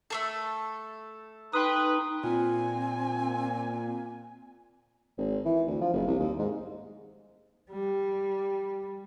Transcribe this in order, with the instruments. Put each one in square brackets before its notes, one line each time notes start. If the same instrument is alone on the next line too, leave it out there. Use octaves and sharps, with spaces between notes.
[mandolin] A3 A#3 A4
[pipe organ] D#4 [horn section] B4 [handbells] G5 C6 D#6
[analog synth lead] A#2 [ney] C4 [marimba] F4 [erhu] G#5
[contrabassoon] G#1
E3
D2
F3
F#1
C2
D#2
G#2
[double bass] G3